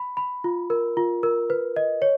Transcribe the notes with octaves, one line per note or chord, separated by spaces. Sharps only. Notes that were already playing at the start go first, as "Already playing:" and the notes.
Already playing: B5
B5
F4
A#4
F4
A#4
B4
D#5
C#5